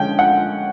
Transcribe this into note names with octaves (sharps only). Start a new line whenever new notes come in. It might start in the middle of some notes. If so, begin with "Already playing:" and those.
Already playing: D3 F3 G#3 C#4 G5
F#5